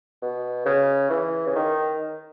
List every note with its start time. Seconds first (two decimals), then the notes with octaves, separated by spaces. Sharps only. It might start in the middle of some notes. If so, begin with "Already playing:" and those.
0.22 B2
0.66 C#3
1.10 E3
1.47 C#3
1.56 D#3